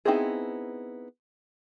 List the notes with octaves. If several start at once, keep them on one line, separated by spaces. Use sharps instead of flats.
B3 C4 D#4 E4 G#4